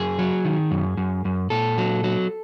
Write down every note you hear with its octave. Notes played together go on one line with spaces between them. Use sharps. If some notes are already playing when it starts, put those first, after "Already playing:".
Already playing: F#2 G#4
F#3
D#3
F#2
F#2
F#2
A#2 A4
F#3
F#3